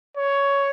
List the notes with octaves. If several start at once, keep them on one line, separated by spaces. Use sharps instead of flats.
C#5